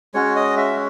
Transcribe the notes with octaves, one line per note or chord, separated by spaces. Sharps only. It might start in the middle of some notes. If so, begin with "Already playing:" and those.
G#3 C#4 F#4 C#5
D#5
E5